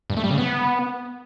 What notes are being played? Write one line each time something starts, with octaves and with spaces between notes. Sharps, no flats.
G2
A3
G3
C#3
B3